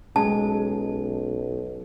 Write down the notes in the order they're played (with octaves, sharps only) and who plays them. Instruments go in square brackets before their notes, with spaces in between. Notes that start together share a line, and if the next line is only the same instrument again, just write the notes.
[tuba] B1 [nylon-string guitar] G#3 [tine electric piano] C#4 [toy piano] A5